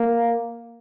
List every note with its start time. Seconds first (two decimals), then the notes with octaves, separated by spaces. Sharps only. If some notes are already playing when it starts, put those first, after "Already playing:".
Already playing: A#3